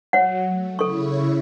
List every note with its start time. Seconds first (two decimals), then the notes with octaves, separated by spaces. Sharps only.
0.13 F#3 C#5 F#5
0.49 A3
0.79 C#3 E4 A4 C#5 C#6